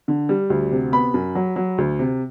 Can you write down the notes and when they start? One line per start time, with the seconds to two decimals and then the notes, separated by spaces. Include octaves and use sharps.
0.08 D3
0.29 G3
0.50 D2
0.71 C3
0.92 B3 B5
1.14 F#2
1.35 F#3
1.56 F#3
1.78 D2
1.99 C3